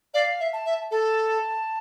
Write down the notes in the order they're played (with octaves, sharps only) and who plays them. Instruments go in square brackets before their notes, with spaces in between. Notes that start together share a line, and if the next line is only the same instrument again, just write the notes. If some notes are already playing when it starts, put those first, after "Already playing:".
[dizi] D5 [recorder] F5
[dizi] E5
[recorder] A5
[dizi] E5
[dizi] A4 [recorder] A5